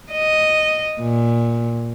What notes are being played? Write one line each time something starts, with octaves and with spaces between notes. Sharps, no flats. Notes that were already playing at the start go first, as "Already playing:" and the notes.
D#5
A#2